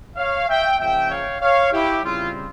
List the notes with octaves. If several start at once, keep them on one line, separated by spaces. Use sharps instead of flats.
C#5 F5
E5 G5
C#3 F3 A#3 C#4 E5 G5
C#5 F5
C#5 F5
E4 G4
C#3 G3 C4 F4